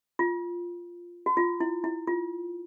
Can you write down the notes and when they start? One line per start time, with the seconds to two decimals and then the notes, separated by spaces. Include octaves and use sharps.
0.19 F4
1.26 F#4
1.37 F4
1.60 E4
1.84 E4
2.07 F4